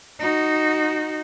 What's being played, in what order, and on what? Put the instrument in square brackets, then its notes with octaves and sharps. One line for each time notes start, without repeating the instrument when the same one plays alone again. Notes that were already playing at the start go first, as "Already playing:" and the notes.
[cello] D#4 F#4